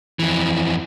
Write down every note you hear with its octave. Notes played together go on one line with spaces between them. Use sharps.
F2 E3